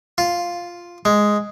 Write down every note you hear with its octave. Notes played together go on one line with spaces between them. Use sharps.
F4
G#3